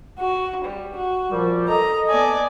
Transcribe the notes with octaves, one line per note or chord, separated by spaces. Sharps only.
F#4
G3
F#4
A#2 F3 G3
A4 D#5 A#5
B3 D5 G#5